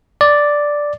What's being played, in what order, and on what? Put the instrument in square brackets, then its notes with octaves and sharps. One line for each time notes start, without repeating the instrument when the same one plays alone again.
[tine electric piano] D5